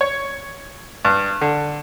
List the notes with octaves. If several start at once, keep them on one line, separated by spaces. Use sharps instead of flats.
C#5
G2
D3